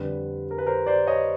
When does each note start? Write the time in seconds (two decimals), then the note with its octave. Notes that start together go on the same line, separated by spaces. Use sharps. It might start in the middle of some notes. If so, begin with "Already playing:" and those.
Already playing: F2 D3 G3 B4
0.51 A#4
0.58 B4
0.67 A#4 C5
0.86 C5 D5
1.07 C#5 D#5